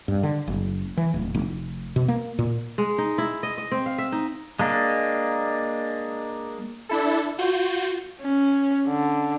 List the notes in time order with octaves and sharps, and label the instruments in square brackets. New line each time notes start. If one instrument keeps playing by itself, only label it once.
[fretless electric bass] G2
D3
F#1
E3
D1
F1
B2
A#3
A#2
[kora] G#3
D#4
E4
D#5
D#5
C4
F5
E5
D#4
[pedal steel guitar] G#3 A#3 D4
[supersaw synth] D4 E4 A4
F4 F#4 G6
[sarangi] C#4
D3